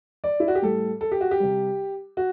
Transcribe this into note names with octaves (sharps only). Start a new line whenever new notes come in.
D5
E4
F#4
G4
A2 G3 A4
A4
G4
F#4
G4
C3 G3
F#4